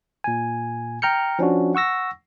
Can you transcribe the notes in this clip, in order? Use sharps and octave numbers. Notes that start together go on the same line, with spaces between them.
A#2 G#5
G5 A#5 F6 G6 C#7
F3 C#4 D4 F#4
F#5 C#6 E6 A#6